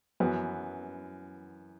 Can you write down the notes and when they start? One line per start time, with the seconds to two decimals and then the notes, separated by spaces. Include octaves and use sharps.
0.20 F#2 E3 B3